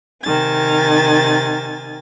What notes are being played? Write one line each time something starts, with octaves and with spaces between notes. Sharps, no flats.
C3 D#3 G#5 A6